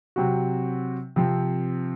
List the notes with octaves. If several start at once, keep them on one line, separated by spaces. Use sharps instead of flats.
C3 F#3 C4 F#4
C3 F3 C4